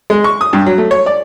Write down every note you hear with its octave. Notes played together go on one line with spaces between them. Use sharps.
G#3
C#6
D#6
G2
F#3
A3
C#5
D5